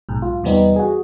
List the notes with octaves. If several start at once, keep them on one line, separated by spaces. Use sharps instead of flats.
B1 G#2
F4
E2 C3 G3 B3 C4 D#4
F#4 G#4